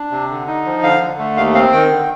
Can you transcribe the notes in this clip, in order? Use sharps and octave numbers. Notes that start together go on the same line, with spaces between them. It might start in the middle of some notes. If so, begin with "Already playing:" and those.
Already playing: D4
C3
D3
D#4
F3
D3 F5
D3
A3
D#2 F5
C4 F5
D#3 G5
D3